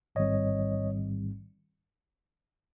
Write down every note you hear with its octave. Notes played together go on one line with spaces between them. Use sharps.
A1 G#2 D#3 G3 C4 C#5 D#5